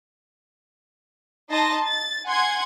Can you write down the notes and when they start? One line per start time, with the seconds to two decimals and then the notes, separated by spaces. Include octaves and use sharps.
1.50 D#4 D#5 A5 C6 A#6
1.85 A6
2.26 F#5 G#5 C6 G#6